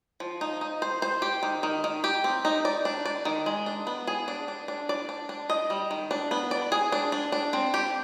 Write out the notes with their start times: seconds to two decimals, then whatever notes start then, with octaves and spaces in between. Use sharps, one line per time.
0.20 F3
0.41 D#4
0.61 D#4
0.82 C5
1.02 C5
1.22 G4
1.43 D#3
1.63 D#3
1.84 D#3
2.04 G4
2.24 C4
2.45 D#4
2.65 D5
2.85 D4
3.05 D5
3.25 D#3
3.46 G#3
3.66 D4
3.87 B3
4.07 G#4
4.28 D4
4.48 D4
4.68 D4
4.89 D5
5.09 D4
5.29 D4
5.50 D#5
5.70 G3
5.91 D#3
6.11 D4
6.31 B3
6.51 D5
6.72 G#4
6.92 D4
7.12 D4
7.32 D4
7.53 C4
7.74 G4